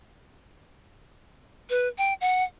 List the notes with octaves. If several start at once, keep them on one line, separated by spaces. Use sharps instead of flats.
B4
G5
F#5